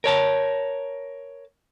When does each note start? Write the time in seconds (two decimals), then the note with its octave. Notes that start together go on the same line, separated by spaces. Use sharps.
0.04 A#4 C#5 A5